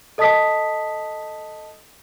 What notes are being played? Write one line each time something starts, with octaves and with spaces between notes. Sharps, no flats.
A4 D#5 A5 D#6 B6